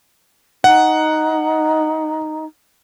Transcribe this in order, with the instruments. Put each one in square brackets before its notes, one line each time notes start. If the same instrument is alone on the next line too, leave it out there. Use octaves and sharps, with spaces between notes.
[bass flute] D#4 [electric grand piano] F#5